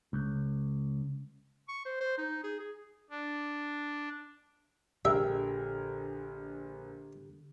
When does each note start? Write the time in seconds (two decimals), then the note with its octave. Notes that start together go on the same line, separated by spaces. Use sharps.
0.13 C#2
1.68 C#6
1.85 C5
2.01 C5
2.18 D#4
2.44 G#4
2.60 G#4
3.10 D4
5.05 A#1 D3 G4 G#4 A#4 E5